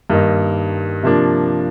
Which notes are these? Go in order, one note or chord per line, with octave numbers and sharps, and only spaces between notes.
G2 D#3 A#3 D#4
C3 F3 A#3 D4